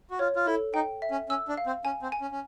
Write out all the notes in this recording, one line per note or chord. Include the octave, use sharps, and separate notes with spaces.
F#4
F4 C#5
F4
E4 A4
D#4 G5
E5
C#4
C#4 E6
D4
F5
C4
C#4 G#5
C4
G#5
C#4
C#4